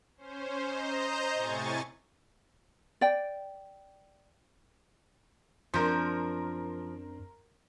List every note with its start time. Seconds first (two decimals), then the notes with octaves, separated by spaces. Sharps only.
0.17 C#4 C5
0.66 C5 D#5 A#5 G6
1.33 A2 C3 G#5 C#6 A6
3.01 D5 G5
5.74 F#2 F3 C4 D4 A#4 C6